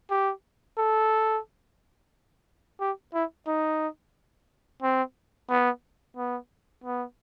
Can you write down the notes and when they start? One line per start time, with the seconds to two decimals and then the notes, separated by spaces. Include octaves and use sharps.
0.11 G4
0.78 A4
2.81 G4
3.14 E4
3.47 D#4
4.82 C4
5.50 B3
6.17 B3
6.84 B3